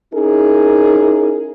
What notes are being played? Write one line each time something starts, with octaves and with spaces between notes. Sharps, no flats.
C#4 D#4 E4 G#4 A#4